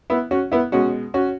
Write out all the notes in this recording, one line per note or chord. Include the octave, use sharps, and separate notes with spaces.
B3 E4
C#4 F#4
B3 E4
B2 G#3 C#4 F#4
C#4 F#4